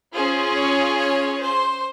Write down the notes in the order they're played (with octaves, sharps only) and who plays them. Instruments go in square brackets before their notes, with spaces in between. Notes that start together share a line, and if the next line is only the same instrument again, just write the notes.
[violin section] C#4 F4 G#4 C5
C#5
C#5
C5